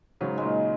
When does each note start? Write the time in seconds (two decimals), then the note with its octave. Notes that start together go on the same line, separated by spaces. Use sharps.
0.21 G#2 C#3 F#3
0.38 A#2 G#3